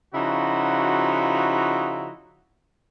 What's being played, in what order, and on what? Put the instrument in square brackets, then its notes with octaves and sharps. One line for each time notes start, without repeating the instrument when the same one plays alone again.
[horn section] C#3 F3 D#4 E4 F#4